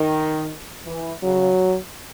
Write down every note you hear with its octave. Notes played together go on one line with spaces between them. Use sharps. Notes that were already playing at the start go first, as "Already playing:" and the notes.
Already playing: D#3
E3
C#3 F#3